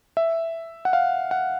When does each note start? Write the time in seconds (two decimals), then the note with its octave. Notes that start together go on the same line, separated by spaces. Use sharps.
0.17 E5
0.85 F#5
0.93 F5
1.31 F#5